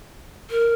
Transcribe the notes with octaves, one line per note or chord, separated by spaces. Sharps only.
A#4